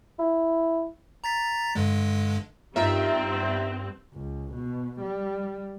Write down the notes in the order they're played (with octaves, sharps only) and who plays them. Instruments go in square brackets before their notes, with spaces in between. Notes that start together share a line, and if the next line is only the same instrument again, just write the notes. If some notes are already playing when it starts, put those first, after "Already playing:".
[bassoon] E4
[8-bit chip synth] A#5 A6 B6
G2 D3 G#3
[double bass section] G2 [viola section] C4 [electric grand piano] D#4 F4 A#4 [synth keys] E5
[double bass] C#2
B2
G3